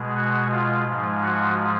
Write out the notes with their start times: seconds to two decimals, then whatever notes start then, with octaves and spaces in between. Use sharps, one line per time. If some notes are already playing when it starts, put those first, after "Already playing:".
Already playing: B2 G#3
0.15 F#4
0.51 F4
0.86 G#2 F3 G#3
1.22 F#4